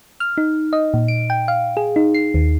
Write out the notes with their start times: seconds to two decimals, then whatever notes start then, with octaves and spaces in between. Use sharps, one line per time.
0.20 F6
0.38 D#4
0.73 D#5
0.94 A#2
1.08 D7
1.30 G5
1.48 F5
1.77 G#4
1.96 D#4
2.14 C7
2.34 D#2